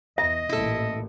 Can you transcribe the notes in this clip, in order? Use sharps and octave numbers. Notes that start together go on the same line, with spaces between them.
E2 D#5 E5
A1 A#2 E4 A4